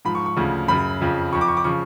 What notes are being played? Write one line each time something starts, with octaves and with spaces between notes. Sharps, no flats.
G#2 F3 B5
C#6
C#6
D2 C#3 F3
F#2 C#3 F#3 B5
F2 C#3 F3
F2 F3 C#6
D6
C#6
D6
C#3 F3 C#6